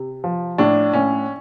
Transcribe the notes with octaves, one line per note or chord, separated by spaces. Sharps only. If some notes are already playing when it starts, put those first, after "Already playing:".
Already playing: C3
F3
A2 D4
A2 C#4